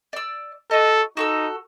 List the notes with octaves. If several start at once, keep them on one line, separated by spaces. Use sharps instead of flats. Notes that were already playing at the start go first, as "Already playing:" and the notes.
D5 E6
F#4 A4 D#5
D#4 F#4 A4 E6